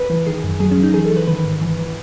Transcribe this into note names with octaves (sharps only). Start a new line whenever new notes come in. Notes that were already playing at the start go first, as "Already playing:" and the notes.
Already playing: B4
E3
D#3 G#4
F#2
F#3 G#4
C#4
F#3
D#4
E3 G#4
A4
E3
B4
D#3 B4
G#2
E3
E3